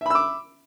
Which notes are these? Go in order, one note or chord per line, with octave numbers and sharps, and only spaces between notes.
E5 B5 D6 E6